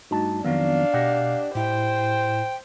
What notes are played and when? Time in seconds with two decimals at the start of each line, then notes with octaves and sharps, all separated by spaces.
0.11 G2 A3 D#4 F#4 A5
0.44 F2 D#3 F#3 B3 D4 F5
0.94 B2 G4 D#5 F#5
1.55 A2 E4 C5 G5